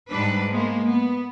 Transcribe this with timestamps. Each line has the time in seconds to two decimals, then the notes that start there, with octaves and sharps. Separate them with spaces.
0.11 G#2 G3 D4 B4
0.53 G#3 A#3 B3
0.86 B3